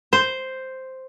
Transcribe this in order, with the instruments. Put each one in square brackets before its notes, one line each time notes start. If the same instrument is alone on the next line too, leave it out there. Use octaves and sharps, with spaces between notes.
[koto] C5